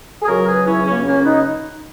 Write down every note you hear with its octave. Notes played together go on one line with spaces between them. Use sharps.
G#4
C#2 C#3 F#3 F#4 A#4
G#4 B4
C#4 E4
C#2 C#3 F#3 A#3 C#4
A#3 C#4
B3 D#4